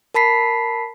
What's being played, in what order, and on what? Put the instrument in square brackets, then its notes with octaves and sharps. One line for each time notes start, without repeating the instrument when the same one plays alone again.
[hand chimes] A#4 A5 B5 B6 C7